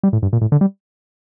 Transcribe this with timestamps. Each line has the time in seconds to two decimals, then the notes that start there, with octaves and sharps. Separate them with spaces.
0.03 G3
0.13 A2
0.22 G2
0.33 A#2
0.41 A2
0.52 D3
0.61 G3